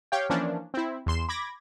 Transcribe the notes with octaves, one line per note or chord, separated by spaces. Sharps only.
G4 C#5 F5 G5
E3 F3 A#3 C#4 D4
C4 E4
E2 C6 E7
B5 D6 G#6 A#6